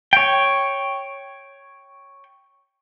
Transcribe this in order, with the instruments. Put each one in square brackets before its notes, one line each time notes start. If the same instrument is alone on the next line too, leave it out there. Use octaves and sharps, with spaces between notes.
[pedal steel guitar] C#5 G5